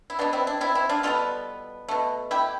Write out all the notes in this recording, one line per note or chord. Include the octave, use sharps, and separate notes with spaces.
E4
B2 B3 D4
C4 E4
D4
C4 E4
C4 E4
D4 F4
B2 G3 B3 F4 A4
B2 A3
E4 G4